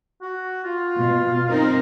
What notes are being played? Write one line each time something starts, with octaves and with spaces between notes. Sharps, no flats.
F#4
F4
B2
C4 D#4 A#4